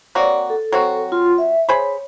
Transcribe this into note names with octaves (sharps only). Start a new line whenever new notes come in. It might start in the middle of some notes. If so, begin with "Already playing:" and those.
A#3 C4 F#4 C#5 D5
A4
F#3 C4 F#4
F4 C6
E5
G#4 C5 C#5 B5